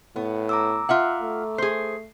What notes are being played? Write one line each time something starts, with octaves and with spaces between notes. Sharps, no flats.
A2 B3
A#5 D6 E6
F4 E5 F#5
A3
G#4 C5 C7